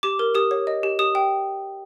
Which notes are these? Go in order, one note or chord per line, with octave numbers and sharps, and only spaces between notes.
G4 D6
A#4
G4 D#6
C#5
D#5
G4
G4 D#6
G5